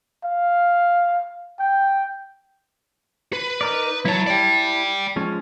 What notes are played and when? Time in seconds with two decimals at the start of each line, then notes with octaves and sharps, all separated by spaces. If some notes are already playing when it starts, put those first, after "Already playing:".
0.24 F5
1.59 G5
3.33 B4
3.61 D#4 A#4 D5
4.05 F#3 E4 C#5 A5
4.26 D5 G5
5.16 F3 G#3 C#4